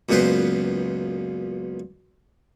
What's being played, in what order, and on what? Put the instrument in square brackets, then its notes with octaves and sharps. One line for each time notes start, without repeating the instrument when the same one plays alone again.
[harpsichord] C#2 F#2 A#2 B3 B4 C5